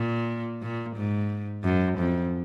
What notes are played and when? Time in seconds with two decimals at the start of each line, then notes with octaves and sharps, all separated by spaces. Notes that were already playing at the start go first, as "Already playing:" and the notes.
Already playing: A#2
0.62 A#2
0.96 G#2
1.64 F#2
1.98 F2